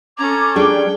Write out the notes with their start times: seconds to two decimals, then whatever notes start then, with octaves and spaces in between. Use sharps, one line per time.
0.18 C#4 A4 A#5 D6 G#6
0.56 G3 D4 G#4 G5